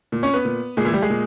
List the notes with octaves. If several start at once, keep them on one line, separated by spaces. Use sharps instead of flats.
A#2
C#4 C#5
B3 B4
A#2
A#2 G#3 G#4
E3 E4
G3 G4
G#3 G#4
A#2